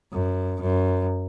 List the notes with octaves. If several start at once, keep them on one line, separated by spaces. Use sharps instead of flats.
F#2
F#2